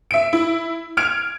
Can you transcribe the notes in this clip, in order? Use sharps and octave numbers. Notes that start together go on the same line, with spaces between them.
E5 D7
E4
F6 G#6 D7 F7